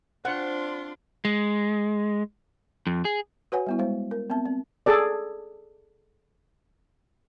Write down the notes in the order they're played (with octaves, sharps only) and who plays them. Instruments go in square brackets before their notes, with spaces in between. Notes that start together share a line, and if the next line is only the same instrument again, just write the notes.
[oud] C4 [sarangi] D4 [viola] F4 C6 [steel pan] F#5
[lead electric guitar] G#3
F2
G#4
[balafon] F#4 B4 C#5 F#5 G#5
G3 B3 E4
G#3 C5
A#4
B3 C4 E5 A5
C4
[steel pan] G#4 A4 D5